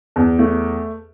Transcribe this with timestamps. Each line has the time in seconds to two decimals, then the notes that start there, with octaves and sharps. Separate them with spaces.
0.16 E2
0.39 A3